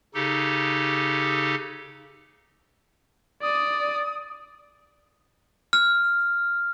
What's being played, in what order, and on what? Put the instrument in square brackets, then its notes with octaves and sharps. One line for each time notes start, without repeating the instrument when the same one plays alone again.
[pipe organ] C#3 D#4 G4 A4
[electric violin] D5 [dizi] D#6
[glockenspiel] F6